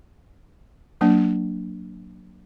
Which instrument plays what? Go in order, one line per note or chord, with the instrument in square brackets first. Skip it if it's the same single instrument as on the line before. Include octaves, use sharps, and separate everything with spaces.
[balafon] F#3 A#3 D4